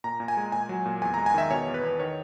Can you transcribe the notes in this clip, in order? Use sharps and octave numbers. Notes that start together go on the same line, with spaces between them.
A#2 A#5
A#2
G#5
G#3
A#2 G#5
F#3
A#2
E2 G#5
G#3 A#5
G#5
D#3 E5
B2 C#5
E2
B4
E2
D#3 C#5